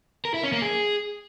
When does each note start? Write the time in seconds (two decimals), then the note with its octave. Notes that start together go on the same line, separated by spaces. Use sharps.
0.25 A#4
0.34 E4
0.43 C#4
0.53 A#3
0.62 G#4